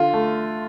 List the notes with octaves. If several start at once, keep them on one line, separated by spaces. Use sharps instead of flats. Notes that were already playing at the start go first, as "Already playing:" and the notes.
Already playing: D3 F4
A3